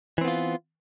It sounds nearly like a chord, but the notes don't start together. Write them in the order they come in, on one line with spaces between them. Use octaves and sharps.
E3 C4 B3 F4